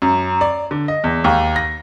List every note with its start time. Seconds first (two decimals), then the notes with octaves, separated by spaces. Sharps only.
0.02 F#2
0.41 D5
0.71 D3
0.88 D#5
1.04 E2
1.24 D#2
1.56 A#6